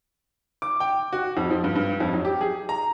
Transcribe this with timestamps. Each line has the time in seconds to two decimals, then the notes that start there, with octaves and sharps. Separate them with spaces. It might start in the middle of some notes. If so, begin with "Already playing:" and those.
0.62 D6
0.80 G5
1.13 F#4
1.37 F2
1.50 F3
1.64 G2
1.75 G2
2.00 F2
2.13 F#3
2.25 G4
2.41 G#4
2.69 A#5